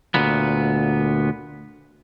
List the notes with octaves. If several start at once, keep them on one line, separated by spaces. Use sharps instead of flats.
D2 A#2 B3